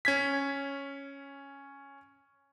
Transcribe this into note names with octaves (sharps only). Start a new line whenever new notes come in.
C#4 G#6 B6